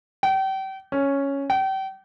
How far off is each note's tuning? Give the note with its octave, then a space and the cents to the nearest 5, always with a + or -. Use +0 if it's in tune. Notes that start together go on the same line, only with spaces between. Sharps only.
G5 -35
C#4 +0
G5 -35